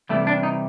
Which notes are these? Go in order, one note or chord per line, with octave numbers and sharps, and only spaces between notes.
C3 E3 G3 A3
D4
D#4